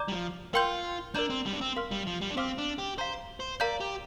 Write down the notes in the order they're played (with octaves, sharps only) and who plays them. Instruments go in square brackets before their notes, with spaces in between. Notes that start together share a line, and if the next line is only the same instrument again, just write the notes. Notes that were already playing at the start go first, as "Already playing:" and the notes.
Already playing: [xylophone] D5 A#5 D6 G6
[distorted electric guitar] G3
F3
[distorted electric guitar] F4 [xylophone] A#4 G5 C6 G6
[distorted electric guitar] D4 [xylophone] A#4 D5 A#5 G6
[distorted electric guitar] C4
G3
D4
C4
[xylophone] A#4 F5 C6 F6
[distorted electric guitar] G3
F3
G3
D4
[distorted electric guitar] C4 [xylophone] C5 F5 D6 F6
[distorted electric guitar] D4
G4
[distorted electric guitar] C5 [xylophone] F5 A#5 G6
[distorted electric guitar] C5
[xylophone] A#4 F5 A#5 G6 [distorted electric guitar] D5
[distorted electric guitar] G4